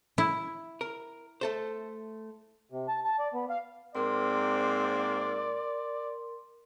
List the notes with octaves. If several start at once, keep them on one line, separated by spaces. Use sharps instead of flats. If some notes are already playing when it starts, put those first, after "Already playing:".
E4
A#4
A3 A4 C5
C3
A5
A5
D5
B3
F5
G#2 A#3 C4 A#4 D5 C6